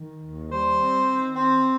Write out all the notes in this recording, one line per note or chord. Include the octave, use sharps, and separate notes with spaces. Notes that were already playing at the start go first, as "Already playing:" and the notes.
Already playing: D#3
D#2
G3 C5
C4
D#3
C4